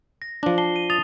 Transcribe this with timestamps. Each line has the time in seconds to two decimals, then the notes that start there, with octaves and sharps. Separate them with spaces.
0.22 A#6
0.43 F3 D4
0.58 A5 C7 G7
0.76 D#7
0.90 D#6 A6 F7